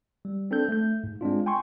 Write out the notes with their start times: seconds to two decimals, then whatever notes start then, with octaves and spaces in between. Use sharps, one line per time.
0.25 G3
0.51 C4 D4 A4 G6
0.69 A3 G6
1.04 G#2
1.21 G#3 C4 D4 F4
1.46 G5 G#5 C6 C#6